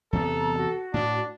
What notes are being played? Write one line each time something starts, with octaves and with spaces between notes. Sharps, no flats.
E2 C3 B3 A4 A#5
F#4
A2 D4